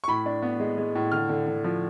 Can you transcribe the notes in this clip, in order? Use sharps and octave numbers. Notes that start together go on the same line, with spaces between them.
C#6
A2 B5
D4
B3
G#3
G#3
A2
D3 F6
D3
D3
F3